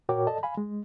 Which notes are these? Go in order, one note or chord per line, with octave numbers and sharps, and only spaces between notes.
A#2 F#4 A#4 C#5 G5 D6
A4 D5 D#5 A5
F5 G#5 B5
G#3